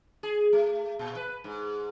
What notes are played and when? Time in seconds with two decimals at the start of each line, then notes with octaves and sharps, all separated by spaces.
0.23 G#4
0.53 A3
0.99 A#2
1.16 B4
1.44 G#2